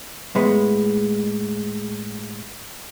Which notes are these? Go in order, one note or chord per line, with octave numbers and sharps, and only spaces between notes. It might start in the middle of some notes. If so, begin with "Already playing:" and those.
A2 G#3 B3